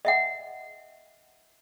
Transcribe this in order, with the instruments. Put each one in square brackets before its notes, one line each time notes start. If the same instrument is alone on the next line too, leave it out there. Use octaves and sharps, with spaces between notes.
[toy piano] D#5 E5 F#5